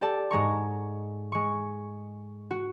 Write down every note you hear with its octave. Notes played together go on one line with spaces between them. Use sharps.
G4 A4 D5 A5
G#2 G#3 A#5 C#6
G#3 C#6
F#4